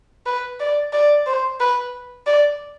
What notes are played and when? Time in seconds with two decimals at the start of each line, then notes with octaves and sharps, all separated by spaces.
0.26 B4
0.60 D5
0.93 D5
1.27 C5
1.60 B4
2.27 D5